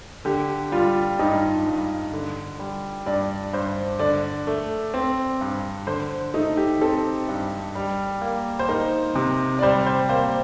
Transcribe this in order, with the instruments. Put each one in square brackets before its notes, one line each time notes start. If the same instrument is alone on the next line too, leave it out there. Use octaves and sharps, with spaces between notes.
[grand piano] D3 [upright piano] G4
[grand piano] G3 [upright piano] F4
[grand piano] G2 [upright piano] D#4
[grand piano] G2
D3
G3
[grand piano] G2 [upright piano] D5
[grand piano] G2 [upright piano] C5
[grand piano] D3 [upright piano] D5
[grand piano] A3
C4
G2
[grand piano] D3 [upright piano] C5
[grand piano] A3 [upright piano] D#4
[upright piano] G4
[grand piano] C4 [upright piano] A4
[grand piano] G2
G3
A#3
[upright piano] C5
[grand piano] D#4 [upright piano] A#4
[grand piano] C3
[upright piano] D5
[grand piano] G3 [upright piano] C5
[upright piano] C5
[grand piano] A#3 [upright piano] C5